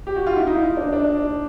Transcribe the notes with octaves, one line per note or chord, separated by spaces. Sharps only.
G4
F#4
F4
E4
D#4
D4
D4